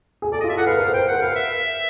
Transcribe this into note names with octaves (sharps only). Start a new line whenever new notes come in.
G#4
A4 D5
F4 D#5
E5
A4 F#5
B4 F5
A#4
C5 G5
B4
A#4 F#5
B4 F5
E5